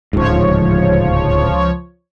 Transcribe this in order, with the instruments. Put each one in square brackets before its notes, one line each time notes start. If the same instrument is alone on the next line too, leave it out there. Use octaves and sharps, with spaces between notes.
[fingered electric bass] D1 G#2 [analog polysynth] C#2 F3 C#5